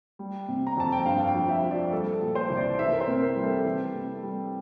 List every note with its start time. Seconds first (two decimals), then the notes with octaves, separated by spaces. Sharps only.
0.19 G3
0.48 C3
0.67 A#5
0.77 F2 A5
0.92 G5
1.05 G2 F5
1.27 G5
1.35 F3
1.49 E5
1.63 F3
1.71 D5
1.92 G3 A4
2.14 A4
2.21 A#2
2.35 C5
2.50 C2
2.57 D5
2.79 E3 E5
2.93 A#4
3.01 C5
3.07 C3
3.22 A#4
3.36 G3
3.44 A4
3.65 E3
3.94 C3
4.23 G3